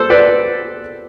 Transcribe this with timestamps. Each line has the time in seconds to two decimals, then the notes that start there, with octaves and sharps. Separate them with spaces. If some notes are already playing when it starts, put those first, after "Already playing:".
Already playing: A4 C5
0.10 B4 D5